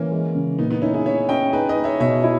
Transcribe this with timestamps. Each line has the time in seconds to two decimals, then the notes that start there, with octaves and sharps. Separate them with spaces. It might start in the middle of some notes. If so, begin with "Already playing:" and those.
Already playing: E3 A#3 C#4
0.11 G#3
0.35 C#3
0.58 A#2 B3 D#4
0.70 B3 D#4
0.82 C#4 D#4 E4
0.94 E4 G#4
1.06 C#4 C#5 E5
1.29 C#4 D#5 G5
1.53 D#4 G#4 B4
1.69 B4 D#5
1.76 D#4
1.84 C#5 E5
2.00 B2 C#5 E5
2.24 E4